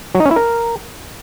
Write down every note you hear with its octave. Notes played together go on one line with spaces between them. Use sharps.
F#3
D#4
C#4
E4
A#4